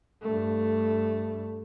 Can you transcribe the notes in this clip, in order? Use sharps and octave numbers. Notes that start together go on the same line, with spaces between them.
G2 A3